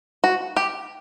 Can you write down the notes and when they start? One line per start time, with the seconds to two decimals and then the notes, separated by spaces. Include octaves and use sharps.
0.24 F#4
0.57 G4